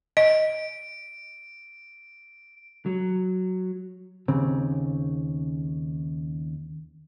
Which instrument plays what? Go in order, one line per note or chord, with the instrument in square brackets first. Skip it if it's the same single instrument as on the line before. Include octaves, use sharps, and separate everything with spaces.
[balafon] D#5 [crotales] D7
[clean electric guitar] F#3
[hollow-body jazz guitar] D#2 C#3 C4